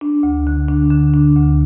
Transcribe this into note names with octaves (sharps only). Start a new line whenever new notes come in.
D4
D2
D3
D4
D3
D4
D2